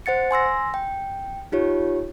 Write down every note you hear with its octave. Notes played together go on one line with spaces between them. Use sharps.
C5 F#5 A6 C#7
G#5 C6 E6 A#6
G5
D#4 F4 G4 C#5